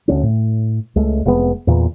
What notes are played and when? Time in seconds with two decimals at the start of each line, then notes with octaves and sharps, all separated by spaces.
0.08 D2 G3 C#4
0.23 A2
0.96 C#2 G#3 A3
1.25 F1 C3 G#3 B3
1.67 E2 A#2 E3